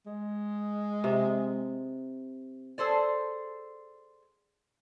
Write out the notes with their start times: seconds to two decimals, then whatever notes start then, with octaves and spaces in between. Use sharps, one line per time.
0.06 G#3
1.04 C3
2.78 G#4 A4 C5 D5